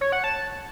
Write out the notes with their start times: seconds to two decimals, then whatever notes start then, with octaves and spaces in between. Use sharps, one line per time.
0.01 C#5
0.12 F#5
0.24 A5